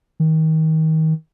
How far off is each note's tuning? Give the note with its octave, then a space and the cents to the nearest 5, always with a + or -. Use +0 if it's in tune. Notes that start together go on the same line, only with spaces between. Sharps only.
D#3 +30